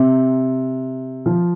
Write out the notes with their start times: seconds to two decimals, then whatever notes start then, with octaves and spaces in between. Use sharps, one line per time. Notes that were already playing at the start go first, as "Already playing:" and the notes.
Already playing: C3
1.26 F3